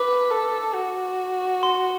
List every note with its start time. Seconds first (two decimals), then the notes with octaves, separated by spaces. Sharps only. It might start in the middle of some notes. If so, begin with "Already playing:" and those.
Already playing: B4 D6
0.30 A4
0.74 F#4
1.63 C6